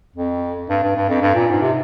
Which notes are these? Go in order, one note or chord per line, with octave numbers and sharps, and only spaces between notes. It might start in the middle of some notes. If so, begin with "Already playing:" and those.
F2
G2
G2
G2
F2
G2
A#2
G#2
C3